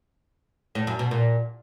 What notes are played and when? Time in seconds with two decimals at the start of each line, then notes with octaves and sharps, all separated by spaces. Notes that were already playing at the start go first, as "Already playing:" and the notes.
0.75 A2
0.87 F#2
0.99 B2
1.11 A#2